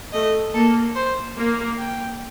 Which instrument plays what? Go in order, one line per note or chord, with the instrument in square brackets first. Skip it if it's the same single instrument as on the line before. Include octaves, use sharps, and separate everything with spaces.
[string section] A3 [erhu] D#5
[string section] A#3 [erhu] A4
[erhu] C5
[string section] A#3
[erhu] G5